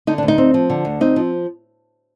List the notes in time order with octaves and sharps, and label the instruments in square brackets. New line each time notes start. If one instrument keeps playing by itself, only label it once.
[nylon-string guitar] D3 D#4
D4
D2
D#4
C4
F3
D3
D2
C4 D#4
F3